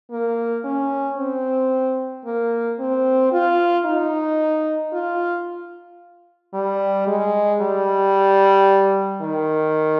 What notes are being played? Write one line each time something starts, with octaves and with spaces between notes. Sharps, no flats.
A#3
C#4
C4
A#3
C4
F4
D#4
F4
G3
G#3
G3
D#3